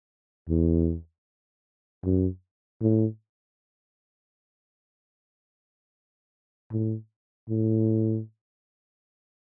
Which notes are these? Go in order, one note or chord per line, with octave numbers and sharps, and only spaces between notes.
E2
F#2
A2
A2
A2